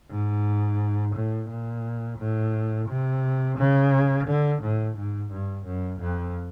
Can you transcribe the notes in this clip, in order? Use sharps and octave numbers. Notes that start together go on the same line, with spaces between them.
G#2
A2
A#2
A2
C3
C#3
D3
A2
G#2
G2
F#2
F2